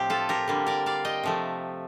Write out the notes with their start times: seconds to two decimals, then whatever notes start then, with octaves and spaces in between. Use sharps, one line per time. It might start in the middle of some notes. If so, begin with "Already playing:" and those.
Already playing: A2 F3 C4 G4
0.10 F4 A4
0.29 G4 A#4
0.48 D3 G3 A#3
0.66 A#4 D5
0.86 D5 F5
1.05 D#5 G5
1.23 C3 F3 A3